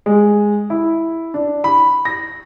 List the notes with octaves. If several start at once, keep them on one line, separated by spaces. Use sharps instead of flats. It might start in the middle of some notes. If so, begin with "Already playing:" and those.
G#3
E4
D4
B5
A#6